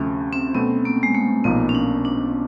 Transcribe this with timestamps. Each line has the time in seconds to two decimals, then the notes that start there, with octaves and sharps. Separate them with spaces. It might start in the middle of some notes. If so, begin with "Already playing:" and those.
Already playing: D2 C3 F3 A3 C#4
0.33 C4
0.55 B2 F#3 A3 B3 C4
0.85 A#3
1.03 G#3
1.15 A3
1.44 B1 A#2 F3 A#3 B3 D#4
1.69 C#4
1.75 D4
2.05 D4